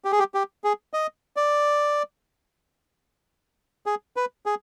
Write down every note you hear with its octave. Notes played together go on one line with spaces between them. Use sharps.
G4
G#4
G4
G4
G#4
D#5
D5
G#4
B4
G#4